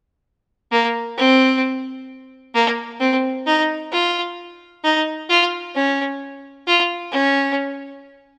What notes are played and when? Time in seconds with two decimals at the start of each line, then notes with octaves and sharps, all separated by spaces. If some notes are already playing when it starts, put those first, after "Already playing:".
0.72 A#3
1.18 C4
2.55 A#3
3.00 C4
3.47 D#4
3.92 F4
4.84 D#4
5.29 F4
5.75 C#4
6.67 F4
7.12 C#4